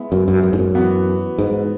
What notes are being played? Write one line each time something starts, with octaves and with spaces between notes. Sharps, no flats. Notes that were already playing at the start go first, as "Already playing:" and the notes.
Already playing: G#3 B3 E4
F#2
F#2
F#2
G#2
F#2
E3 B3 F#4
G#2